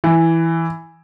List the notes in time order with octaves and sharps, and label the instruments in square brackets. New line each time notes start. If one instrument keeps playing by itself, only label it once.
[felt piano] E3